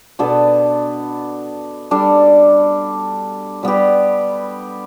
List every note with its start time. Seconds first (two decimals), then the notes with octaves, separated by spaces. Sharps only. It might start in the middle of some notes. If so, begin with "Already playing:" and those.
0.19 B2 B3 D4 A4
1.91 G3 D4 A4
3.63 G3 B3 G4